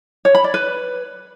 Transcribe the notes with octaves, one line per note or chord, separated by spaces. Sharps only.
C#5
B5
D5
B4